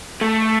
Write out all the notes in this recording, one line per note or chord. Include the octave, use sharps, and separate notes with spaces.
A3